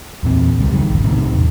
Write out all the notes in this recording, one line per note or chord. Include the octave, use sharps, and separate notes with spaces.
E2 A#2 C4
C#2 F3 G3
F#1 F2 D#3 G#3
G#1 C#2
A2 C3 D#3
E2